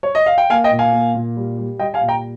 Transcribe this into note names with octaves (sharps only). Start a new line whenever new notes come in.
C#5
D#5
F5
G5
A#3 F5 G#5
D#5 G5
A#2
F5 G#5
A#3
A#2
G3
G3
G3 D#5 G5
F5 G#5
A#2
G5 A#5